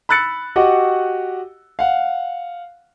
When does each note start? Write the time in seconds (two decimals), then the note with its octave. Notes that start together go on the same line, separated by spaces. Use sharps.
0.09 B5 E6 F#6 A6 C#7
0.56 F#4 G4 D#5 F#5
1.79 F5 F#5